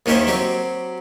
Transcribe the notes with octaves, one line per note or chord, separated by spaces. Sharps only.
D#2 D#3 C#4 G4 C5 E5
F#3 C4 G4